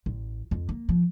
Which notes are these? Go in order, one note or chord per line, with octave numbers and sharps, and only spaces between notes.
A1
F2
A#3
F3